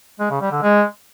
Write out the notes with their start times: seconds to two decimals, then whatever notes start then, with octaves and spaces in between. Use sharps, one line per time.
0.20 G#3
0.31 C#3
0.41 G3
0.52 D3
0.63 G#3